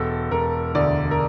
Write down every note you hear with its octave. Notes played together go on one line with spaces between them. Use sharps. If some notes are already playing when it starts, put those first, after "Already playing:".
Already playing: E1 A4
E1 A#4
D2 D5
A#4